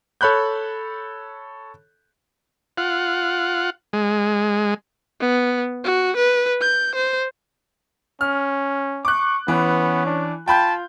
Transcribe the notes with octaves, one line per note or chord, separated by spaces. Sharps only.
A4 C#5 B5 F#6 G6
F4 F#5
G#3
B3
F#4
B4
G6
C5
C#4 F6
C#6 D6 F#6
E3 B3 C#4
D4
F4 G5 A5 B5 G6